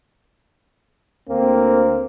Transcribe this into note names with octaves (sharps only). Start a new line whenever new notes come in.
D2 A#3 C4